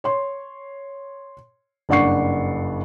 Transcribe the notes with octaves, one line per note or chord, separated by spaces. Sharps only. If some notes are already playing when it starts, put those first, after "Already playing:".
C#5 C6
F#1 G2 D5 F#5 C#6 C7